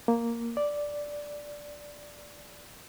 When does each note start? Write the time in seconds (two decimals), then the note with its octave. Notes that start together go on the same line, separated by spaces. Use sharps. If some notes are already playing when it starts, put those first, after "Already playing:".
0.08 A#3
0.57 D5